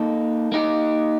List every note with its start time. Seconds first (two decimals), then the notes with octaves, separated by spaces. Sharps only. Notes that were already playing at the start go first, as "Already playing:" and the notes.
Already playing: A#3 D#4 A4
0.52 A#3 D#4 G4